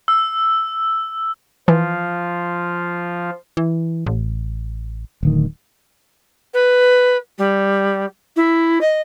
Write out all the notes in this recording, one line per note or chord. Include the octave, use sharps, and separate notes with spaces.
E6
E3 F3 F4
E3
A1
D1 D2 D#3
B4
G3
E4
D#5